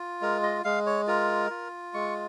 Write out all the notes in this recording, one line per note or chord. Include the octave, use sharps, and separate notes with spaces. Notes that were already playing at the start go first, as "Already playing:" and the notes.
Already playing: F4
G#3 A#4
D#5
G#3 F5
C#5
F4 A#4
F4
G#3 C#6